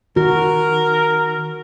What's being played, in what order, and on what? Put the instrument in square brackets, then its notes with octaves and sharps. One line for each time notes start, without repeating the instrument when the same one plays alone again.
[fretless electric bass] D#3 [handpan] F#4 [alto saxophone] A#4